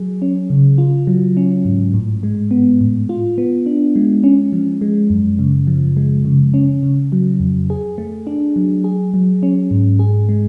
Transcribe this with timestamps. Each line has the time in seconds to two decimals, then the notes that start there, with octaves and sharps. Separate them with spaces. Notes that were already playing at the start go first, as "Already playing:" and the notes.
Already playing: F#3 G#4
0.22 C#4
0.50 C#3
0.78 F4
1.07 F#3
1.37 C#4
1.65 G#2
1.94 A2
2.23 G#3
2.51 B3
2.81 A2
3.09 F4
3.38 B3
3.66 D4
3.96 G#3
4.24 C#4
4.53 F3
4.81 G#3
5.10 F#2
5.39 C#3
5.67 F3
5.97 G#3
6.25 C#3
6.54 C#4
6.83 C#3
7.12 F#3
7.40 F2
7.70 G#4
7.98 A3
8.27 D4
8.56 F#3
8.84 G#4
9.14 F#3
9.43 C#4
9.71 G#2
9.99 G#4
10.29 G#3